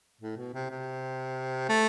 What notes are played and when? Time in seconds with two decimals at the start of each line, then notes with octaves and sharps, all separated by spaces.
0.21 A2
0.37 B2
0.54 C3
0.70 C3
1.69 A3